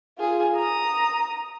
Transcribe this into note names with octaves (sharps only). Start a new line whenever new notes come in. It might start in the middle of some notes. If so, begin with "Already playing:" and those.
F4 G#4
A#5 D#6